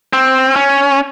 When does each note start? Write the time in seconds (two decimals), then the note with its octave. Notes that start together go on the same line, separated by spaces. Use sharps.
0.13 C4
0.56 C#4